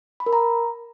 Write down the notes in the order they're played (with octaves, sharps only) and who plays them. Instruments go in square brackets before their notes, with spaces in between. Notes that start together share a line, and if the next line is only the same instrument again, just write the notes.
[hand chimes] B5
A#4
A#5